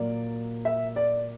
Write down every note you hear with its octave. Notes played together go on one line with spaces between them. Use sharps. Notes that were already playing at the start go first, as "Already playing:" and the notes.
Already playing: A#2 F#3 A#3 D5
E5
D5